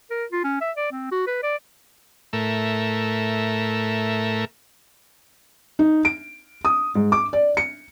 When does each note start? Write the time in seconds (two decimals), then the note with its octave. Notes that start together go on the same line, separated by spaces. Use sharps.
0.10 A#4
0.32 F4
0.44 C#4
0.61 E5
0.76 D5
0.92 C4
1.11 F#4
1.27 B4
1.43 D5
2.33 A2 A3 A#4 E5
5.79 D#4
6.05 D7
6.65 D#6
6.95 G#2
7.12 D6
7.33 D5
7.57 C#7